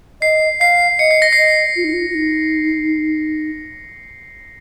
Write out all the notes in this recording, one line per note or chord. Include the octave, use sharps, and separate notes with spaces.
D#5 C7
F5 C7
D#5 C#7
C7
A#6
D#5 C7
F4
D#4
F4
F4
D#4